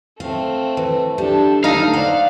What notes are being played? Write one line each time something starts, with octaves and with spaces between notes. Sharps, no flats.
A3 C4 F5
E3
G3 D4 A4
D3 A3 D#4 A4 F5 A#5 D#6
C5 D5 F#5